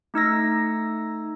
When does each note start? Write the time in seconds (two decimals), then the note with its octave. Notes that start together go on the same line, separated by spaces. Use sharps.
0.14 A3 D#4 E6 A#6